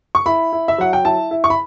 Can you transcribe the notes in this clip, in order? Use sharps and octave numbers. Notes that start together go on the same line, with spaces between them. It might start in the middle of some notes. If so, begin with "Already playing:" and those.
C#6
E4 B5
E4
E5
F#3 F#5
G5
E4 A5
E4
C#6
B5